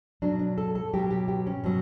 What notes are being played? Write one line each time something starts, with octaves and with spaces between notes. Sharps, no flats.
B2 F#3 D4
D4
A4
A4
B2 F#3 G4
G4
G4
C#4
B2 F#3